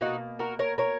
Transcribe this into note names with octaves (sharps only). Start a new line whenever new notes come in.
B2 A#3 D#4 F#4
F#4 A#4
A#4 C#5
A#4 C#5